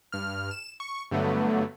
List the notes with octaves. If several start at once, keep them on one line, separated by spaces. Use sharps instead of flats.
G2 F6
E7
C#6
G2 D3 F#3 A3 B3